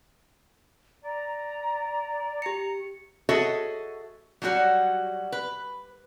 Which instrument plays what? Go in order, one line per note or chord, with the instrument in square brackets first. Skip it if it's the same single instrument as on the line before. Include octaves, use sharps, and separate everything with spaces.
[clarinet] D5 [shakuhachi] A#5
[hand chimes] G4 C#7 [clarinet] A#5
[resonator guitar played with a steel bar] F#4 G#4 A4 C#5 D#5 E5
F#3 G3 D4 F#4 C#5
B4